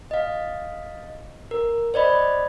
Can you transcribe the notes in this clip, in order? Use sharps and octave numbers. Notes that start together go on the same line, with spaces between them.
D#5 F5
A#4
C5 D5 D#5 B5